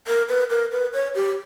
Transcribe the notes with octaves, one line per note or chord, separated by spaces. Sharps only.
A#4
B4
A#4
B4
C#5
G4